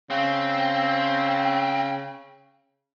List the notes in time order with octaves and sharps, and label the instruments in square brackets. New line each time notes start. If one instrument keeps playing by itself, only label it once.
[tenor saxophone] C#3 [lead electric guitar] C4